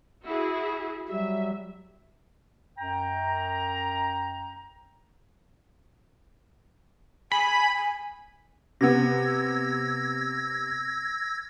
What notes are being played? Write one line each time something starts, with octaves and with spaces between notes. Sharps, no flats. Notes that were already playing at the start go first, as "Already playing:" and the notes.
E4 F#4 G#4
F#3 G3 E5
F#2 G5 A#5
G#5 B5
G#5
C3 B3 E6 G#6 A#6